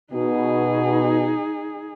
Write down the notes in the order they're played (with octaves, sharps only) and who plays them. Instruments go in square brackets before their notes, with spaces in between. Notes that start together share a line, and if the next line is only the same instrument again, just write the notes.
[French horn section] B2 [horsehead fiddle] D#4 G#4